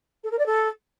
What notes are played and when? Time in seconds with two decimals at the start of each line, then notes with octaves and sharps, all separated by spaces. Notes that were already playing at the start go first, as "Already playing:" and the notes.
0.24 A4
0.31 A#4
0.38 D5
0.46 A4